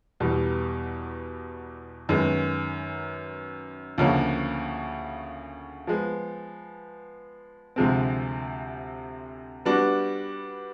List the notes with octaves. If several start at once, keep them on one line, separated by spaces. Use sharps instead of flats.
E2 B2 G3
F#2 D#3 G#3 B3
D2 C#3 F3 A#3 C#4
F3 G#3 B3
D2 C3 F3 G#3 C4
G3 B3 D4 F#4